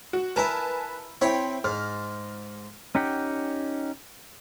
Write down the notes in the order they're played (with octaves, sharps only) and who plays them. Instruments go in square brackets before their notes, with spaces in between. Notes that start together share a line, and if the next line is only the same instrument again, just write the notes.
[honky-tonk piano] F#4
[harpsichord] E4 A#4 [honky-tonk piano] B4 G#5 A5
[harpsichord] C4 C#5 B5 [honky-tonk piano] E4 G5
[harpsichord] G#2 [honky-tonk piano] F6
[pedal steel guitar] C#4 D#4 G4 F#5 G5